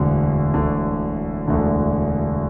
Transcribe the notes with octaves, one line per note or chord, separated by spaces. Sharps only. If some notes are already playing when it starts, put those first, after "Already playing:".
Already playing: E1 D2 D3
E1 D2 D3
E1 D2 D3